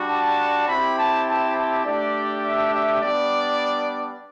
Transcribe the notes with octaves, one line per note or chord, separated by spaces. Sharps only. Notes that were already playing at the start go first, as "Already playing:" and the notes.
Already playing: G3 D4 F#4
A5
C4 E4 G4 B5
A5
A5
A5
A3 D4 G4 D5
E5
E5
G3 B3 D4 D5